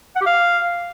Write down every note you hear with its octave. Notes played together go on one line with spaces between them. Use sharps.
F#5
G4
F5